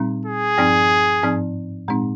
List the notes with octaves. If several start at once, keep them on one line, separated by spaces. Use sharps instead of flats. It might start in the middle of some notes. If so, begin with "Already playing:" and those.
Already playing: A#2 G3 C4 D#4
G#4
G2 F3 C4 D#4
G#2 F3 C4 D#4
A#2 G#3 C4 D#4